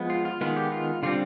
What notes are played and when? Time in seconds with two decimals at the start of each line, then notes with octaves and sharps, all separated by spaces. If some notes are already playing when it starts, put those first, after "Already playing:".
Already playing: F3 G#3 B3
0.10 F4
0.25 F4
0.41 D#3 G#3 B3 F4
0.56 G4
0.72 F4
1.03 D3 G3 C4 F4